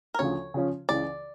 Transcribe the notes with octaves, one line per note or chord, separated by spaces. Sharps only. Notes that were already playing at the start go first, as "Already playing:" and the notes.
A#4
D2 C#3 F3 C#5
C#3 F3 C#4
C#2 C#3 E3 D5